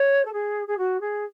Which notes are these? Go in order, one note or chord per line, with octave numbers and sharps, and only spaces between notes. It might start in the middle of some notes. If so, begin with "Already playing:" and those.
Already playing: C#5
A4
G#4
G#4
F#4
G#4